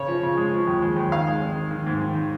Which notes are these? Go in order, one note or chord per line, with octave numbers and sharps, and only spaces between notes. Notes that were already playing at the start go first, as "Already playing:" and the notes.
Already playing: C#3 C#5
F3
C#3
G#3
F3
D#2
G#3
D#2
D#3 F5
G#3
G#1
D#3
D#3
G#2
D#3
D#3